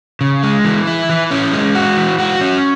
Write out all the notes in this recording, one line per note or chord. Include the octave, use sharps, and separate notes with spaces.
C#3
G#3
E3
E4
E3
C#4
G#3
F#4
E3
F#4
C#4